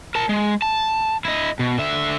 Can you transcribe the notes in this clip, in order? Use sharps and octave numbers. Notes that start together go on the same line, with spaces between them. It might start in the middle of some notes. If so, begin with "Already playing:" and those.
A#4 A5
G#3
A5
E4 D#5
B2
D3 E5